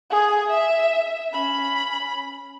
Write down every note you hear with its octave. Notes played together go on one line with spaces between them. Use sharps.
G#4 G#5
E5
C#4 B5